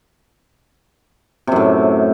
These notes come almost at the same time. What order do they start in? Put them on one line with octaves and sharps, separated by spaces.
C3 F#2 A2